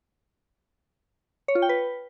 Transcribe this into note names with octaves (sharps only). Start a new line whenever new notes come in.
C#5
F4
G5
B4